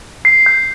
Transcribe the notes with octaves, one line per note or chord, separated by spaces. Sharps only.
C7
G6